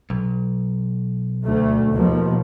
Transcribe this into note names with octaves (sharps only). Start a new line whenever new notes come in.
B1
D2 A3
D#2 B2 F3